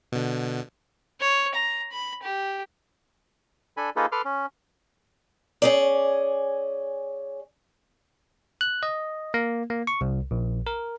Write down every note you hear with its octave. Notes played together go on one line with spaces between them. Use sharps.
B2 D3
C#5
A#5
B5
G4
D4 A4 G#5 B5
A#3 D#4 F4 G#4 A4 B4
A4 B4 C6 D6 F6
C#4
C#4 G#4 D5
F#6
D#5
A#3
A#3
C#6
C2
A#1
A#4